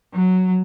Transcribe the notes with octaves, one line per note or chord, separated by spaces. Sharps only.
F#3